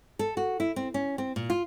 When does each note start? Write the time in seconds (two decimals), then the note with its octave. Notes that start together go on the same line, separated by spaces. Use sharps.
0.19 A4
0.37 F#4
0.60 E4
0.76 C4
0.94 C#4
1.18 C4
1.36 A#2
1.50 F4